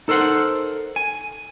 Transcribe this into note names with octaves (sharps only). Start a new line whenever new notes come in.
D#4 A4 A#4 C5 F#5
G#5